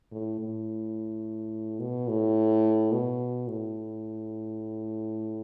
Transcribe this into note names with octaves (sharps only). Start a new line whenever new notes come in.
A2
A2
B2
A2
B2
A2